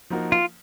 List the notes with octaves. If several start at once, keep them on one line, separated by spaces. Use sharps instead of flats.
F3 A#3 D#4 F#4 A#4
F4